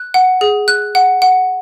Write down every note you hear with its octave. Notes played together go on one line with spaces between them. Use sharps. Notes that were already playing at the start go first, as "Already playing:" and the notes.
Already playing: F#6
F#5
G#4
F#6
F#5
F#5